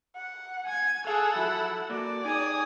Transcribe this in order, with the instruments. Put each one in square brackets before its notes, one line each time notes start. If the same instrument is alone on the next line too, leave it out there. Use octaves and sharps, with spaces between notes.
[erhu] F#5
[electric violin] G#5 G#6
[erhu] G#4 [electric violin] A4 F#5 [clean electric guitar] F5 G#5
[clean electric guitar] F3 F#3 [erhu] E4
[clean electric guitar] A#3 F#4 A4 [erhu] D5
[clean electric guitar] D#4 G4 G#4 [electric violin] G#5 D#6